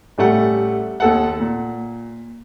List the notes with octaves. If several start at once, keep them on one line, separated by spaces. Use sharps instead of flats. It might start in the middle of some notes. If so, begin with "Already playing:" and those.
A1 G3 A3 F#5
D#2 A4 F#5
A#2